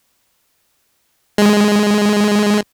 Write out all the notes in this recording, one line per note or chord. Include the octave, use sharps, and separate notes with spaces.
G#3